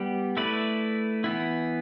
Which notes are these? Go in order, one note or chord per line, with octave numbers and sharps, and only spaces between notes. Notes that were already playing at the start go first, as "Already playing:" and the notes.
Already playing: G3 B3 G4
A3 E4 B4 D5
E3 B3 E4